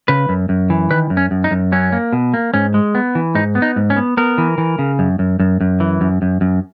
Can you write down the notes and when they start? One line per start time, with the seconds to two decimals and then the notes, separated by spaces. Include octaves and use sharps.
0.08 C#3 B4
0.29 F#2
0.49 F#2
0.70 E3
0.91 D#3 B4
1.10 F#2
1.17 C#4
1.31 F#2
1.44 D#4
1.51 F#2
1.72 F#3 C#4
1.92 A#3
2.13 B2
2.34 A#3
2.54 G#2 C#4
2.74 G#3
2.95 B3
3.15 E3
3.35 G#2 D#4
3.55 B3
3.62 D#4
3.76 G#2
3.90 C#4
3.96 B3
4.17 B3 A#4
4.38 E3
4.58 E3
4.79 C#3
4.99 F#2
5.19 F#2
5.40 F#2
5.61 F#2
5.80 E3
6.01 F#2
6.22 F#2
6.41 F#2